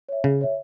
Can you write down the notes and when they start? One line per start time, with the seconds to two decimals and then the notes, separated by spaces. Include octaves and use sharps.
0.09 C#5 E5
0.24 C#3 G#4
0.41 C#5 E5